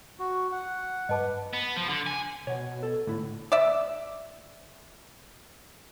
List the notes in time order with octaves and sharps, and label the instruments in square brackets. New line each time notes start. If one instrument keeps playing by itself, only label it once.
[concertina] F#4
F#5
[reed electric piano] G2 B4 [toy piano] D#5 A5 D6
[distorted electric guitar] B3
F3
D3
G#5
[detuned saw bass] B2 [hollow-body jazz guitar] C#5 F#5
[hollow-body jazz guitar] A4
[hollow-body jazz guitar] A2 E4 [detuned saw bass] D3
[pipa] D5 E5